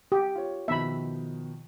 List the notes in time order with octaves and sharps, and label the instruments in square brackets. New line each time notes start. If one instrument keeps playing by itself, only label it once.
[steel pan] G4
[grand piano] F4 C#5
[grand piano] B2 D#3 F3 [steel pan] E5 B5